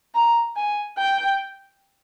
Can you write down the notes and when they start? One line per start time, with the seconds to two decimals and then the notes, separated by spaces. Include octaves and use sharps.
0.14 A#5
0.56 G#5
0.98 G5